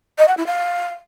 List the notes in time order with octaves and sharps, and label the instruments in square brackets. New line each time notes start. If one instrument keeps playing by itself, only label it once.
[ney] D#5
F#5
E4
F5